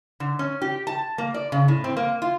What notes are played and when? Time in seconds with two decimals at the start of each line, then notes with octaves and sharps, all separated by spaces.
0.20 D3
0.39 C#4
0.62 G4
0.87 A5
1.18 A#3
1.34 D5
1.52 C#3
1.68 A2
1.84 C4
1.97 A#3
2.22 F4